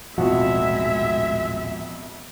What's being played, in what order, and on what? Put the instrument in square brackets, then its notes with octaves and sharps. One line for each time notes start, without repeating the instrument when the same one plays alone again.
[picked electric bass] D#1 A1 F3 [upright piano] F2 B2 F#4 [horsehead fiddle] G#3 E5